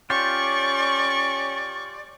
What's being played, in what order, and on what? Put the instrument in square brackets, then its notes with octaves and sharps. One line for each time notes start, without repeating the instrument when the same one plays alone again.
[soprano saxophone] C#4 [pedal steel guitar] F4 G4 [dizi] D5 [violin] C#6